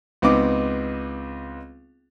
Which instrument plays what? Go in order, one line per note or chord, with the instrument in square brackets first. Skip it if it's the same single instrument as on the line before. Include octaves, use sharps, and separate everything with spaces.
[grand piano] C#2 B3 C4 D#4 D6